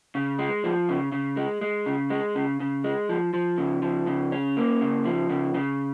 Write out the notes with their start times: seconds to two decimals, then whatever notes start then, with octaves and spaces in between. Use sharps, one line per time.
0.15 C#3
0.39 G#3
0.64 F3
0.89 C#3
1.12 C#3
1.37 G#3
1.61 G#3
1.86 C#3
2.10 G#3
2.36 C#3
2.60 C#3
2.84 G#3
3.09 F3
3.34 F3
3.58 C#3
3.82 F3
4.07 C#3
4.32 C#4
4.57 A#3
4.81 C#3
5.05 F3
5.29 C#3
5.54 C#3